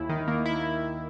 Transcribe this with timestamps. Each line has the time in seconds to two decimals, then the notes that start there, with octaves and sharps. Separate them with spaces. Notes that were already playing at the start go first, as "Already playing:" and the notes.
Already playing: D#2 E4
0.09 D#3
0.28 A#3
0.46 E4